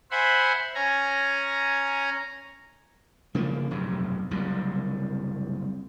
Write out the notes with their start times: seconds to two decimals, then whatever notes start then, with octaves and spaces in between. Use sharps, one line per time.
0.11 C5 E5 F#5 G#5 B5 C6
0.75 C#4 G#5 A#5
3.35 C#3 F3 A#3
3.71 F1 B1 G2
4.31 F#1 C2 F#2